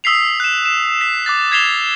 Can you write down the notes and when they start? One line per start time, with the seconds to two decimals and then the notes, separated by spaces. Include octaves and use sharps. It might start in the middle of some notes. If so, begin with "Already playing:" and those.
0.04 D#6 E6 B6 C7 F7
0.40 F#6 E7
0.65 E7
1.01 B6
1.26 D6 F#6 A6
1.52 G#6 B6 C7 E7 F7 G7